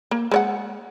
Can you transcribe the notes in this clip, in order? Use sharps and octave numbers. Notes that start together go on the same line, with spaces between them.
A#3
G#3 C#5 F#5